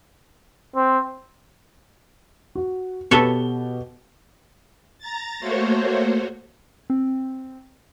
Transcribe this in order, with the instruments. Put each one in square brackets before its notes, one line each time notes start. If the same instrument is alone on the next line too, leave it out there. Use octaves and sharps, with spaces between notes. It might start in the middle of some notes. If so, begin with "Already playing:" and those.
[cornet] C4
[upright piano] F#4
[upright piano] B2 G4 G7 [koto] A4 B4 C#5
[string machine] A#5 A6
A3 A#3 F#4 C5 C#5
[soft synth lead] C4